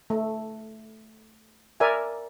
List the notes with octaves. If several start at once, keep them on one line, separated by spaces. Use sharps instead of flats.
A3
A#4 D5 E5 G#5